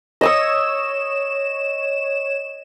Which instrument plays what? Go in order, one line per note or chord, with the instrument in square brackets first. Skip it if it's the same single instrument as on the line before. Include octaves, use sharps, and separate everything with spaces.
[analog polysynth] C#5 E7 [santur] D#5 D#6 E6